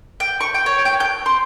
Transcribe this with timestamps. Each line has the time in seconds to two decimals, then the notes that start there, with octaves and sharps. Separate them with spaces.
0.20 G5
0.41 C#6
0.54 G5
0.66 C#5
0.85 G5
1.00 G6
1.26 C6